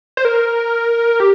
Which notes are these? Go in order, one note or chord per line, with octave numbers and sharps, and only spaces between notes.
C5
A#4
G4